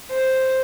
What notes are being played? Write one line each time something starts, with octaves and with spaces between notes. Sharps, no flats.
C5